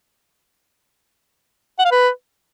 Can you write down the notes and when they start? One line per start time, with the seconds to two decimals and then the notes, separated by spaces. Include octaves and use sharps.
1.79 F#5
1.85 F5
1.91 B4